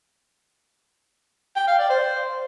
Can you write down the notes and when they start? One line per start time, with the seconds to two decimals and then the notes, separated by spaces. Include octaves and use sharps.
1.56 G5
1.67 F5
1.79 D5
1.90 C5